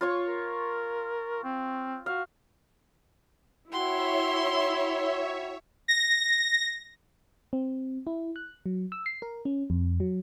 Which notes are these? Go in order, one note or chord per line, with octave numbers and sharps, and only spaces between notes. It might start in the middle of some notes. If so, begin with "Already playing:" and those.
F4 C#5 C#6
A#4
C4
F#4 F5
E4 F#4 C#5 E5 F#5 G5 C6
A#6
C4
E4
F#6
F#3
E6
C7
A#4
C#4
F2
F#3